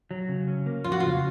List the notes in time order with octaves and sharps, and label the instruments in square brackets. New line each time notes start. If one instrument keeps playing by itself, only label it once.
[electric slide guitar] F#3
C#3
C#4
A#3
[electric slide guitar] F2 [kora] F4
[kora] F#4
[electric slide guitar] C#3 [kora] F4